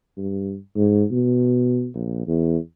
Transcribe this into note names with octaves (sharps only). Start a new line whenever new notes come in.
G2
G#2
B2
A#1
E2